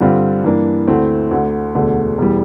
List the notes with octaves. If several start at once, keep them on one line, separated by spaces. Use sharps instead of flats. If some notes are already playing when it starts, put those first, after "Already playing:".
G2 D3 G3 C4 F4
G2 E3 A#3 D4
D2 D3 A3 C4 E4
D2 D3 A3
E1 D2 D3 A3
E1 E3 G3